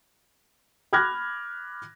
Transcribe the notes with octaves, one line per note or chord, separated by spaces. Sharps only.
B5 D6 F6 F#6 G#6 A#6